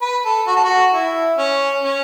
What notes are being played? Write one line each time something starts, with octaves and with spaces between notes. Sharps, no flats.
B4
A4
F#4
A4
F#4
E4
C#4
C#4